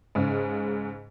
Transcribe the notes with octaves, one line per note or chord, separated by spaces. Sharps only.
G#2 C#3